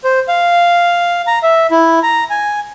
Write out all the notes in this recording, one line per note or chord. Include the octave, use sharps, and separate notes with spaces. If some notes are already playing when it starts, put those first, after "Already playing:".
C5
F5
A#5
E5
E4
A#5
G#5